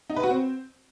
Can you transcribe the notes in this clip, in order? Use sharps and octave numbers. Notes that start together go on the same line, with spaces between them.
D#4
B4
F#4
C4